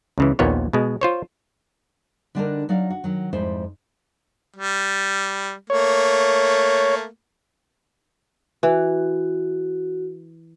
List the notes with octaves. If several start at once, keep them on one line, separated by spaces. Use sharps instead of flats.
C#2 C#3 E3
A#1 D#2 A#2 A#3 B3 C#5
B2 G#3
F4 C5 C#5
D3 G3 D4 D#4 A4 A#4
F#3 D#4 F#4 D5 F5
F#4
D#3 F#3
F2 G#2 G3 D#4 E4 C5
G3
A3 A#3 C#5
E3 F#4